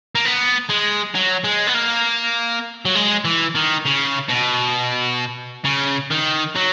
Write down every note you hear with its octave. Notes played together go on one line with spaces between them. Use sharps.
A#3
B3
G#3
F#3
G#3
B3
A#3
F#3
G#3
E3
D#3
C#3
B2
C#3
D#3
F#3